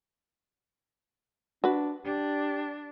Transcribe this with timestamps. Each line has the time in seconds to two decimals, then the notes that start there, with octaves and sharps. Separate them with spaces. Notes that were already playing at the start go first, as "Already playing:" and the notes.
1.64 D4 F#4 B4
2.04 D4 G4